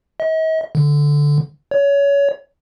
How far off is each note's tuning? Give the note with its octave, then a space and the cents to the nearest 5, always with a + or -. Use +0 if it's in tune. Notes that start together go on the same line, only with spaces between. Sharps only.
D#5 +45
D3 -5
C#5 +25